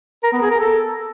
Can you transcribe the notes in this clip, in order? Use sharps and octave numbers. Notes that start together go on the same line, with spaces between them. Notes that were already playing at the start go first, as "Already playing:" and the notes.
A#4
B3
G#4
A#4
A4